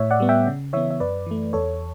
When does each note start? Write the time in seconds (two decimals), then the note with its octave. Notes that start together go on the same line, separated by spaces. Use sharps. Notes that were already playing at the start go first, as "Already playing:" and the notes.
Already playing: A2 C#5 E5
0.11 D5 F#5
0.20 G3 B3
0.29 E5 G5
0.47 C#3
0.73 E3 B3 C#5 E5
0.91 E5
1.00 F#2 B4 D5
1.26 E3 A3
1.53 E2 A4 C#5